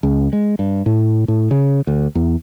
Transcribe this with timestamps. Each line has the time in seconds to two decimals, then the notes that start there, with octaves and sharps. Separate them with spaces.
0.03 C#2
0.33 G#3
0.59 G2
0.86 A2
1.28 A2
1.51 C#3
1.87 D2
2.15 E2